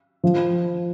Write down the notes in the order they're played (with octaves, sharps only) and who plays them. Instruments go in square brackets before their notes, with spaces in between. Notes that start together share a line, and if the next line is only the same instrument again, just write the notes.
[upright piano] F3